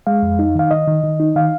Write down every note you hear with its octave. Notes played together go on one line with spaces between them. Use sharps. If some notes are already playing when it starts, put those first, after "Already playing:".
G#3 F5
F2
D#4
D#3 F5
D#3 D#5
D#3
D#3
D#4
D#3 F5